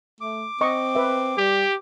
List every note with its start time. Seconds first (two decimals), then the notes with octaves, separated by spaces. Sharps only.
0.21 A3 D6
0.61 C4 D#5 C#6
0.95 B4 E5
1.38 G3 G4